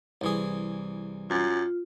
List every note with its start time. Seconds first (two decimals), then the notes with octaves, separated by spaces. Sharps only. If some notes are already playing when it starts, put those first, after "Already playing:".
0.21 C2 E3 G#4
1.30 F#2 F4